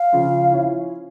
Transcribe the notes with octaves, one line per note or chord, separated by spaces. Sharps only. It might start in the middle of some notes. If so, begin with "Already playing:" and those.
Already playing: F5
C#3 F3 C#4 F4
F3 C#4 E4